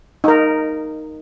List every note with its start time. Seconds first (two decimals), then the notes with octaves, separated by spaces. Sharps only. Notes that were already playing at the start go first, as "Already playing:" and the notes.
0.24 D#4 A#4